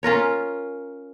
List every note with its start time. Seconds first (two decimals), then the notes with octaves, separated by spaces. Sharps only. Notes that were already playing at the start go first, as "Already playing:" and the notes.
0.03 C#4 F4 A#4 C#5